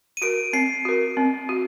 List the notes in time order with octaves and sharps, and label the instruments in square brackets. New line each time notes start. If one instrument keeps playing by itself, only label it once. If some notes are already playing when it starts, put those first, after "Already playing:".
[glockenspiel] D#7
[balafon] F#4 A#4 [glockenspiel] D7
[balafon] C4 [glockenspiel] C7
[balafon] F#4 A#4
C4
F#4